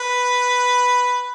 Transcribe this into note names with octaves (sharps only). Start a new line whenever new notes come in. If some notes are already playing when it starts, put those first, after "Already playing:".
Already playing: B4